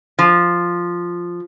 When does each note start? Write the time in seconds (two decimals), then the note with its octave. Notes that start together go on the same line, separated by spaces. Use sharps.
0.19 F3